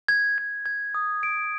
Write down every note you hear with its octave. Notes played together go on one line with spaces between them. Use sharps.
G#6
G#6
G#6
D#6
D7